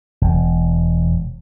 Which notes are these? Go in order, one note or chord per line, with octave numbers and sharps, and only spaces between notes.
E1